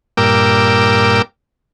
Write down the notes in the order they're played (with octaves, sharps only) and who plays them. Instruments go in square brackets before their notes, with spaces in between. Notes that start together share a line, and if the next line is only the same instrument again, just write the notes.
[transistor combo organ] G2 A#2 A#4 G5 D6 E6